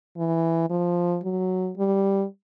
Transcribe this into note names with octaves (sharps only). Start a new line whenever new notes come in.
E3
F3
F#3
G3